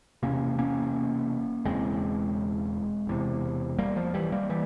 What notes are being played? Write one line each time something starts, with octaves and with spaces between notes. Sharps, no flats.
E1 E2 C3 A#3 C#4
A#3 C#4
E1 E2 C#3 G#3 C4
E1 E2 C3
G3 A#3
F3
E3 G3
G3 A#3
E3 G3